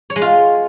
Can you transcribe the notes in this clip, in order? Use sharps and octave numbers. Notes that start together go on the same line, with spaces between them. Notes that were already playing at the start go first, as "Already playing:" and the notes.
C#5
G#3
F4